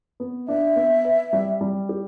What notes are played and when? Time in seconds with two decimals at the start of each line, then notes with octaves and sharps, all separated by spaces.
0.20 B3
0.48 D4 E5
0.76 B3
1.05 B4
1.33 G3
1.61 G3
1.89 G4